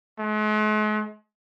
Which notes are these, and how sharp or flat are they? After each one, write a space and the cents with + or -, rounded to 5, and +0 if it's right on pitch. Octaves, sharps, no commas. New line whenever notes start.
G#3 +45